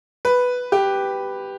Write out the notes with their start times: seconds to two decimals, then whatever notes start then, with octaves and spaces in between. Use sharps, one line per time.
0.25 B4
0.72 G4